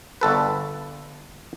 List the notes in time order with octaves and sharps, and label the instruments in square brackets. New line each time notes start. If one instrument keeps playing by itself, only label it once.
[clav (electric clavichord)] G1 A4 B4